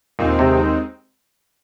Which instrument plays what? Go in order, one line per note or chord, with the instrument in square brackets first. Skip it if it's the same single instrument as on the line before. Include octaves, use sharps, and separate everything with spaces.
[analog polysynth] D#2 D#3 G#3 C4 D#4 [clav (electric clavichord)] A#2
[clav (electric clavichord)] C3